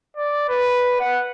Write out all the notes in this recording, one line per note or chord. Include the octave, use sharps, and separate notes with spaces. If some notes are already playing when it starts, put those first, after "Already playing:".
D5
B4
F#5